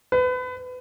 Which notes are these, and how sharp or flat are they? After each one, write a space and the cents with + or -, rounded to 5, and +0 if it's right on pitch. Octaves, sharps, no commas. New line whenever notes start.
B4 +30